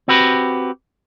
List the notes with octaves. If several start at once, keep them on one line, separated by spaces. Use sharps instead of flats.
C4 F#4 G4 B4